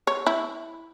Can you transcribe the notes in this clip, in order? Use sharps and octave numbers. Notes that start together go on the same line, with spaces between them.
C#5
E4